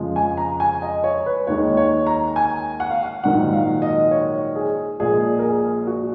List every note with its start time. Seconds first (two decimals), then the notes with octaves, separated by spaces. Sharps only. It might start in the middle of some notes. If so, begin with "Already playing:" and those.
Already playing: F2 C#3 F3 G#3
0.16 G#5
0.37 A#5
0.60 G#5
0.82 D#5
1.04 C#5
1.26 B4
1.47 D#2 D#3 G#3 C#5
1.77 C#5
2.07 A#5
2.36 G#5
2.80 F#5
2.91 F5
3.03 F#5
3.24 A#1 G#2 D#3 F#3 F#5
3.53 F5
3.82 D#5
4.11 C#5
4.56 G#4
5.00 A#1 A#2 G#3 G#4
5.39 A#4
5.43 G#4
5.87 F#4